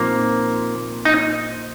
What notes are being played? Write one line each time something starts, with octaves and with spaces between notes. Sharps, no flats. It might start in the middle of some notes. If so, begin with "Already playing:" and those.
Already playing: A#2 F3 A#3 C4 D#4
D#4